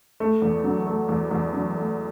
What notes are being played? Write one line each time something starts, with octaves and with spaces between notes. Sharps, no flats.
A3
E2
F#3
A3
E2
E2
F#3
A3